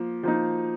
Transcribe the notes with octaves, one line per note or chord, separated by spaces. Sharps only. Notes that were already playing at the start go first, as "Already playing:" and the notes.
Already playing: F3 A#3
F3 A#3 D#4